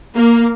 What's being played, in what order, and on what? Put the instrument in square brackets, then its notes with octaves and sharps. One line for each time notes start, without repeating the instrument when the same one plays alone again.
[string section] A#3